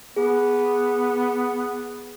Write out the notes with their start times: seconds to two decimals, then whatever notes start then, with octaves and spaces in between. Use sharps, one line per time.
0.16 B3 G#4